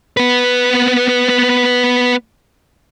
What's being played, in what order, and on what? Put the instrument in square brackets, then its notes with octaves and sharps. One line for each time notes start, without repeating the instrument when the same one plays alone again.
[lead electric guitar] B3 B4